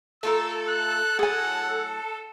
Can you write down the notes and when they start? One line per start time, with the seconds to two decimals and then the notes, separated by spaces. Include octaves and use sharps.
0.23 A3 F4 A4 A#4 E6
0.69 F#6
1.19 A2 F#3 G#4 F#5 G#5